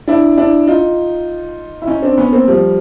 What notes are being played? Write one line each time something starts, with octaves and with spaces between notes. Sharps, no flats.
D4 E4
D4 E4
D#4 F4
E4
C#4 D#4
C4 D4
B3 C#4
A#3 C4
F3 G3